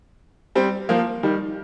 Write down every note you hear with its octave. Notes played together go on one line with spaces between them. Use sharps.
G3 C4
F3 A#3
D#3 G3